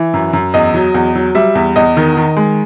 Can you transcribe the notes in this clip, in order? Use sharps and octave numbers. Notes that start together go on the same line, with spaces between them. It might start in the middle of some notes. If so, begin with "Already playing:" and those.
Already playing: E3
F#2
F#2
E2 D#5
F#3
E2
F#3
G3 E5
E2
E2 D#5
D#3
D#3
G#3